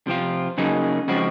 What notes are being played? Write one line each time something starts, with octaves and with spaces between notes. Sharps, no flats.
C3 F3 C4 F4
C#3 F#3 A#3 D#4 G#4
C#3 F3 G#3 C4 F#4